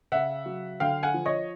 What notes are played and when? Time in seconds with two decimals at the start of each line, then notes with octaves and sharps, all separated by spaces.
0.12 C#3 E5 F#5
0.46 F#3
0.80 D3 F5 G5
1.03 F#5 G#5
1.14 F3
1.26 C#5 D#5